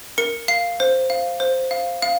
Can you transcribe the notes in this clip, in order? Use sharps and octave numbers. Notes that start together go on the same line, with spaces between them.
A#4 C#7
F5 C7
C5
F5
C5
F5
F5